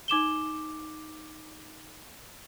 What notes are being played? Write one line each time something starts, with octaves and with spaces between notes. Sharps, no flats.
D#4 D6 E7 G7